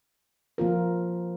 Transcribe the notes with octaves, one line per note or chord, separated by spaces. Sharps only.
F3 A#3 F4 A#4